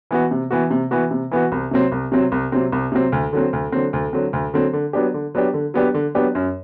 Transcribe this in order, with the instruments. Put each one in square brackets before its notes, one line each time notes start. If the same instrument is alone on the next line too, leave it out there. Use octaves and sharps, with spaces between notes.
[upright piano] E3 B3 F#4
C3
E3 B3 F#4
C3
E3 B3 F#4
C3
E3 B3 F#4
C2
C3 F#3 C4
C2
C3 F#3 C4
C2
C3 F#3 C4
C2
C3 F#3 C4
D2
D3 F#3 C4
D2
D3 F#3 C4
D2
D3 F#3 C4
D2
D3 F#3 C4
D3
F#3 B3 D4 G4
D3
F#3 B3 D4 G4
D3
F#3 B3 D4 G4
D3
F#3 B3 D4 G4
F#2